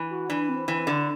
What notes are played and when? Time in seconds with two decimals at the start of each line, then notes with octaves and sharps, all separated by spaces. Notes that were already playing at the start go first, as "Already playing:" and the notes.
Already playing: E3
0.10 F#4
0.29 E3 D4
0.49 C4
0.68 E3 C4
0.87 D3 D4